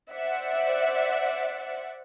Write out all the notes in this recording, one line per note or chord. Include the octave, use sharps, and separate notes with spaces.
C5 D5 E5 F#5